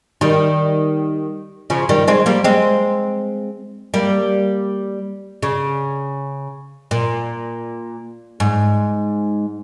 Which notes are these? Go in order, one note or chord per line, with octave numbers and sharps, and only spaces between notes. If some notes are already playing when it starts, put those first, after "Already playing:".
D#3 G3
C#3 F3
D#3 G3
G#3 C4
G3 A#3
G#3 C4
G3 A#3
C#3
A#2
G#2